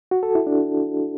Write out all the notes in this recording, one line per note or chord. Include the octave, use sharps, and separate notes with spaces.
F#4
A4
E4
D4